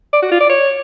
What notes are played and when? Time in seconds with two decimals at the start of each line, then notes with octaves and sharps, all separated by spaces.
0.13 D5
0.22 F#4
0.31 F4
0.40 D5
0.49 C#5